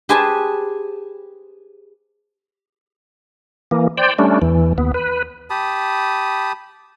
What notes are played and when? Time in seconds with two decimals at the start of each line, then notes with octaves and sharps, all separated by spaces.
0.09 G4 G#4 B4 C5 G#5 A5
3.71 E3 A#3
3.98 C5 D5 G5
4.18 G3 A3 C#4 D4
4.42 E2 E3
4.78 D#2 B3
4.94 B4
5.50 G4 A5 B5 D#6